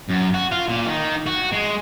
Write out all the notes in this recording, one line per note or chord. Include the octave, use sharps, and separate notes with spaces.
F#2
F#4
F4
A#2
D#3
F#4
G#3